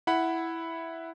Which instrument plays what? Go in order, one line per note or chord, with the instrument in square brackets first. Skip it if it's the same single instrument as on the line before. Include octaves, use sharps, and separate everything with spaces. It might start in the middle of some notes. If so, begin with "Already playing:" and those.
[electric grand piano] E4 F#5 B5